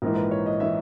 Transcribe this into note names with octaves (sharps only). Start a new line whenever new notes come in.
A#1 G#2 E3 A#4
B4
C#5
D#5
E3 E5